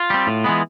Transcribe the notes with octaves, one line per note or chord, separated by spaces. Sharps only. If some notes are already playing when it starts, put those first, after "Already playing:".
Already playing: F4
G3 C4
A2
E3 G#3 B3